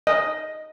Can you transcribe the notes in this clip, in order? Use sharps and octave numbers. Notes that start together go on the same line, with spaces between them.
D#5